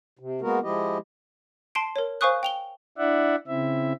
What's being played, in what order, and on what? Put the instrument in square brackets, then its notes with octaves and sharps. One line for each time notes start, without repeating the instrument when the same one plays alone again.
[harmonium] C3
G#3 A#3 B3 F#4 A#4
F3 G#3 E4 G4 D#5
[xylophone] A5 C6 C7 D7
A#4 C#5
C5 F5 G#5 C#6 D#6 F#6
G5 F7 G7
[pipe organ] D4 E4 D5 E5 F#5
C#3 C4 E4 E5